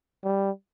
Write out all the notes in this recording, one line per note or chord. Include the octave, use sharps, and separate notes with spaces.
G3